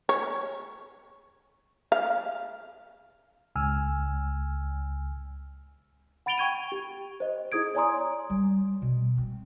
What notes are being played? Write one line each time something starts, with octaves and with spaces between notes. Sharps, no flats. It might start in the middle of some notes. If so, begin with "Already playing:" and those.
C#5
F5
C#2 G#5 E6 F6
F#5 B5 A6 D7 F7 G7
G5 C#6 G#6 D#7
G4
C5 D#5
E4 G#4 D#6 G#6 D7
C#5 D5 G#5 A#5 C6 D#6
G3
B2
C4